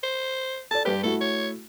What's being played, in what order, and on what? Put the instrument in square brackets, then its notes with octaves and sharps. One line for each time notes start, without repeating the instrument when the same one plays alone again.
[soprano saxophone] C5
[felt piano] A4 D5 [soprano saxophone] A5
[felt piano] G2 B4 [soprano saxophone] G4
[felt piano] A3 E4 F#4 [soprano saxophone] A4
[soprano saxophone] C#5